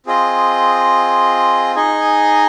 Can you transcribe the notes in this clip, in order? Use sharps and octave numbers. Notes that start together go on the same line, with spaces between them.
C4 F4 G#4 D#5
D#4 G#4 D#5 G#5